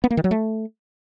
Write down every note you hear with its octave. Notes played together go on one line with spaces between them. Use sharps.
B3
A#3
D#3
F#3
A3